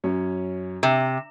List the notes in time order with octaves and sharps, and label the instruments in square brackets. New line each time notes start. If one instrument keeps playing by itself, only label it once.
[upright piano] F#2 C#4 C#5
[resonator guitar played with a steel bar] C3 [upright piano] E7